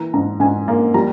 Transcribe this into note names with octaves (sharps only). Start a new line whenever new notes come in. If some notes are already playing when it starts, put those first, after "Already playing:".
Already playing: E3 A#3 A#5
G#2 A#5
G#2 G#5
A#3
G3 A#5